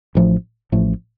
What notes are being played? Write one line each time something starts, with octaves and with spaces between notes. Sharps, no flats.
A1 A2 F3 A3
A1 A2 F3 A3